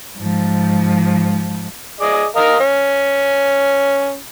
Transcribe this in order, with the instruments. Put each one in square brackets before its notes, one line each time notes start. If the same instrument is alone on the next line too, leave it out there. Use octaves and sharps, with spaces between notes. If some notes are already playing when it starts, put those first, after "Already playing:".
[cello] G#2 F3
[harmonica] G#4 D5 D#5
A#4 D#5 F5
C#4